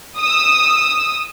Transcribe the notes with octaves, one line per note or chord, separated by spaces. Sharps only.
D#6 E6